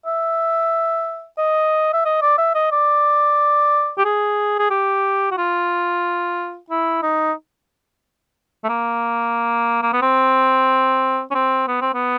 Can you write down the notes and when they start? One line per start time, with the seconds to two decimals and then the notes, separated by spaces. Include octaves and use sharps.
0.06 E5
1.38 D#5
1.93 E5
2.05 D#5
2.22 D5
2.38 E5
2.55 D#5
2.72 D5
3.98 G4
4.05 G#4
4.59 G#4
4.71 G4
5.31 F#4
5.38 F4
6.70 E4
7.03 D#4
8.64 A3
8.69 A#3
9.83 A#3
9.93 B3
10.02 C4
11.31 C#4
11.35 C4
11.68 B3
11.81 C4
11.94 B3